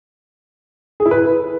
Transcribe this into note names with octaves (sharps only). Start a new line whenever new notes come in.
G#4
E4
B4